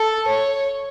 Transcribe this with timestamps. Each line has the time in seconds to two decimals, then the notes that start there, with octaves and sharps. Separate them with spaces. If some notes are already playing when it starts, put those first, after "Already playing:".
Already playing: A4
0.28 C#5